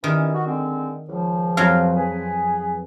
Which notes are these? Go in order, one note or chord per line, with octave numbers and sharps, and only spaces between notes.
D#3 E3 G3 C#4
F#4
D3 G#3 C4
C#2 F3
F2 F#3 F5
G#4 B4